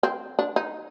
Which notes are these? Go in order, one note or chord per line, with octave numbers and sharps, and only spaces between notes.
C4
D4
D#4